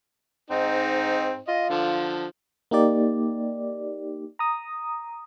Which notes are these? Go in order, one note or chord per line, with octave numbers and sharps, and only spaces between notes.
G#2 C4 D#4
F4 D#5
D3 F3
A#3 D#4 G4 D5
A#5 D#6